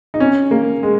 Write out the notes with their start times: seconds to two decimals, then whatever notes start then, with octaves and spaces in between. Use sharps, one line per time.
0.14 D#4
0.20 C#4
0.51 A#3
0.83 G#3